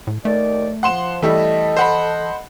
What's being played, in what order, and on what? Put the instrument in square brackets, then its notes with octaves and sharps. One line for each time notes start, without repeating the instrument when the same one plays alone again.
[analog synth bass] A2
[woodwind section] D#2 D#3 D5 [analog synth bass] A3
[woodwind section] F3 [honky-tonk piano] F#5 C6 E7
[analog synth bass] E3 [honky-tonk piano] G3 A3 E4 [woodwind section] A4 D#5
[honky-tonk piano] C5 F#5 B5